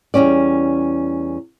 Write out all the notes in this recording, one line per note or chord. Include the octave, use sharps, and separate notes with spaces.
E2 C3 G3 C#4 D5